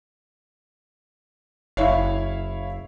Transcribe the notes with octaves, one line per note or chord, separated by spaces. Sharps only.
F#1 E4 C#5 F5